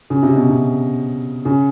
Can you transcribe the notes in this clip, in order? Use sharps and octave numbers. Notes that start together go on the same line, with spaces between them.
C#3
C3
B2
C3
C#3